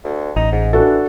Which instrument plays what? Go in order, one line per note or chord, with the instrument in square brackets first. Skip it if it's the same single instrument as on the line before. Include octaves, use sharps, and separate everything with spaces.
[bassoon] D2
[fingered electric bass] A1 [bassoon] D#4
[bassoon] G#2
[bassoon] E3 [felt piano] D4 F#4 A4